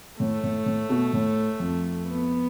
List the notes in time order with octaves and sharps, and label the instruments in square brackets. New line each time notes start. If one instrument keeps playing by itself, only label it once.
[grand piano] A2 [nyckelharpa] A3
[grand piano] A2
A2
B2
A2
F2
[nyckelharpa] B3